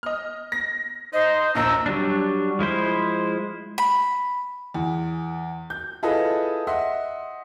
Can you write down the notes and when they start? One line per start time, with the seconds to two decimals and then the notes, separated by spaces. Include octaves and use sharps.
0.03 D#5 F6
0.52 A#6
1.13 D#4 C5 D#5
1.55 A#1 D#2 A#5 E6
1.86 F#3 G3 D4
2.59 F3 G#3 E4 C5
3.78 B5
4.74 E2
5.70 G6
6.03 E4 F4 G#4 A4 B4 D#5
6.67 D#5 E5 F#5 C6